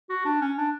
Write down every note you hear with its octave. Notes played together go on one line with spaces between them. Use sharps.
F#4
D4
C#4
D4